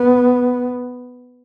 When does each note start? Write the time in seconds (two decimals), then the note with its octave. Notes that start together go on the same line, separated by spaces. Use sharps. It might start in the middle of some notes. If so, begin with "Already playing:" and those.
Already playing: B3